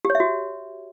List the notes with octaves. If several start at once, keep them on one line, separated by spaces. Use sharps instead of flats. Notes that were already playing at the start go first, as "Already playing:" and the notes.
G4
C#5
E5
F#4